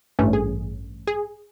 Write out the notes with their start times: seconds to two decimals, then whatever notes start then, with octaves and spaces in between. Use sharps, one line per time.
0.19 A1 G2 E3 A3 C#4
0.33 G#4
1.07 G#4